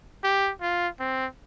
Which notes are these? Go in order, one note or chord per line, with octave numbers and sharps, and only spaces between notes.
G4
F4
C4